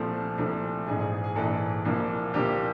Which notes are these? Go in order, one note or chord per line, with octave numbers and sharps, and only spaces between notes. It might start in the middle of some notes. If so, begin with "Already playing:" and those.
Already playing: C2 A#2 F3 A3 C4
C2 A#2 F3 A3 C4
A#1 G#2 E3 G#4
G#4
G#4
G#4
A#1 G#2 E3 A4
C2 A#2 F3 A#3
C2 A#2 F3 A#3 G4